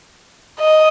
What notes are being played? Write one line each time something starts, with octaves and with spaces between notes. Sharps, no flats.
D#5